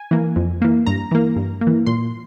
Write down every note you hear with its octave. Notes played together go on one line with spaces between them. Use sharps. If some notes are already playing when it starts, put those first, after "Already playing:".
Already playing: G#5
E3 A#3
F2
E3 A#3
G2 A#5
E3 A#3
G2
A#3
E3
A#2 C6